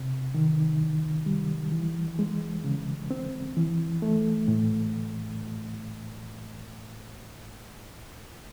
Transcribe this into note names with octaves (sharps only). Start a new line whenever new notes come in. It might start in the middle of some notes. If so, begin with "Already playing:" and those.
Already playing: C3
D#3
C2
G3
E3
G#3
C#3
C4
E3
A3
A2